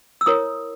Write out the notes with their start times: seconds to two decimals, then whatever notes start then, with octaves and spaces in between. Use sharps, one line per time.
0.21 E6
0.26 E4 A#4 C#5 D#6